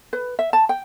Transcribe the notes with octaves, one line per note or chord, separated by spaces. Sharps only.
B4
E5
A5
G5